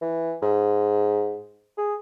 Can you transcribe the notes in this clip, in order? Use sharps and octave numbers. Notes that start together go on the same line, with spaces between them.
E3
G#2
G#4